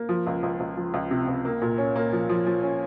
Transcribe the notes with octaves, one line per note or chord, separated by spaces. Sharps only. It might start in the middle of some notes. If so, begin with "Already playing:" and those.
Already playing: A#3
F3
C#2
C#2
C#2
F3
C#2
C3
C#2
A#3
A#2
C#4
A#3
F3
F3
F3
C#4